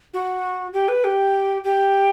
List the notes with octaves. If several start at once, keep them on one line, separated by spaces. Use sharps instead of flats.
F#4
G4
B4
G4
G4